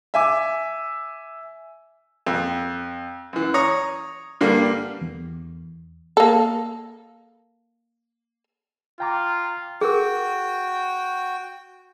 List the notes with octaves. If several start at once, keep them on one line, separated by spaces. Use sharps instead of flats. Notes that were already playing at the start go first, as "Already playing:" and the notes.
E5 G#5 D6
F2
F#2 E3
C#5 A#5 D#6
G2 D3 G3 A#3
E2
A#3 A4
F4 G5 A#5 D6
F#4 G#4 A#4 G5